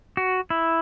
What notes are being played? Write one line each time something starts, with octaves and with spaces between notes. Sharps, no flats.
F#4
E4